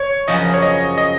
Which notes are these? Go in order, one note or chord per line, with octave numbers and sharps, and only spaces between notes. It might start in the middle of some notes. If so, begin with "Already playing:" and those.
Already playing: C#5
F#2 C#3 F3 D#5
C#5
D#5
D#5